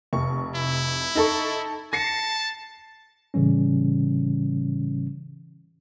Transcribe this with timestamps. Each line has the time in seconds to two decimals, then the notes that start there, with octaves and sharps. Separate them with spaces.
0.13 F1 C#6
0.55 E4
1.15 D#4 A4 C#6
1.93 A5 A#6 C7 C#7
3.34 A2 C#3 E3 G3 C#4